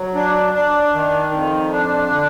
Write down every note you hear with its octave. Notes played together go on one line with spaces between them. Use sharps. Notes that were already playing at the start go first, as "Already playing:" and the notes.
Already playing: F#3
D4
D4
D#3
F2
D4
D3